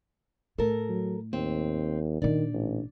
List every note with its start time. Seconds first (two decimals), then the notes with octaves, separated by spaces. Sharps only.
0.58 A2 A4 A#4
0.89 F#3
1.33 D#2 C4
2.22 A#2 D#3 D4 D5
2.54 A1